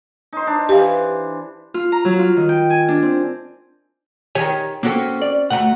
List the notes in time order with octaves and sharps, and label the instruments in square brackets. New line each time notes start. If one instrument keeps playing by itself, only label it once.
[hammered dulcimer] D#4 C5
D4
[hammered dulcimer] E3 [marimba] G4 F5
[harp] F4
A#5
F#3
F4
D#3
G5
G#5
D4
C4
[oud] D#3 [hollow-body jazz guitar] G4 C#5 G#5
[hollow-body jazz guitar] A#3 A4 [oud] C4 C#4 F#4
[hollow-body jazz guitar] D5
[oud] D2 A3 F#4 [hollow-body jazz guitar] F#5 A#5